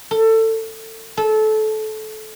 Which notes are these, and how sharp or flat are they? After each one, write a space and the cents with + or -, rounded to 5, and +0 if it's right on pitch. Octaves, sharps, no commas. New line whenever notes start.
A4 +25
A4 -20